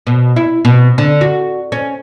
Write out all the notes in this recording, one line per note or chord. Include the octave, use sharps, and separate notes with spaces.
B2
E4
B2
D3
F#4
C#4